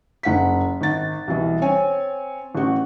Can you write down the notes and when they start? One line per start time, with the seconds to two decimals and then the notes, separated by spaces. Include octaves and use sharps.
0.23 F#1 F#5 B6
0.81 G#1 A6
1.28 C2 B2 E3
1.61 C4 C#5 G#5
2.55 A1 F#4